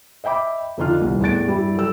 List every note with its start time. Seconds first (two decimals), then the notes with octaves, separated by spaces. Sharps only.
0.24 D#5 E5 G5 B5 D6
0.77 F2 D3 D4 D#4 F4 F6
1.01 D#1 C2
1.21 E2 A2 D5 A6 D7
1.47 G2 G3 E4
1.76 F#3 A4 E6